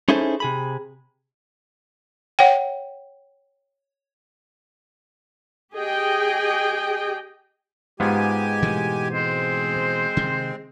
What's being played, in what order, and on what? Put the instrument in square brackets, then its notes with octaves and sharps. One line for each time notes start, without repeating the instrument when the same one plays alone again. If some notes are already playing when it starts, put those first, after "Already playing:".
[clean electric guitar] C#4 D#4 E4 G#4 A4 C5
C3 G#4 B5
[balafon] C#5 F#5 G5
[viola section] G4 G#4 D#5 G5
[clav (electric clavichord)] G#2 B3 F4 [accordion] G#3 G4 G#5
[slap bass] B2 E3 A3
[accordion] G#3 C4 [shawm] C5
[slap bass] C3 D#3